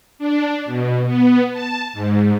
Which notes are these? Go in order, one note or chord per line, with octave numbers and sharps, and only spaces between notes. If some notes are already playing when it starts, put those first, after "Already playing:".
D4
B2
B3
A5
G#2